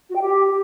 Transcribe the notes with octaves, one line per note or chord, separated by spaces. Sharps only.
F#4
G5
G4